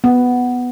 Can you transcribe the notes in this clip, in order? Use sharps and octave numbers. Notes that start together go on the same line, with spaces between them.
B3